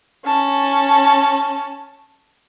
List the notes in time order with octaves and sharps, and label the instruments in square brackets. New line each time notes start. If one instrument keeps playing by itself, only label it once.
[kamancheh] C#4 A5